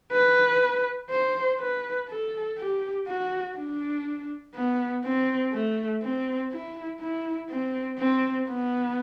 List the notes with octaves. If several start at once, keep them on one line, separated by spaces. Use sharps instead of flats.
B4
C5
B4
A4
G4
F#4
D4
B3
C4
A3
C4
E4
E4
C4
C4
B3